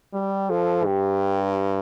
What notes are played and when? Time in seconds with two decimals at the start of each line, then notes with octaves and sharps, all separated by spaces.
0.14 G3 G4
0.50 F3 A4
0.85 G2 G4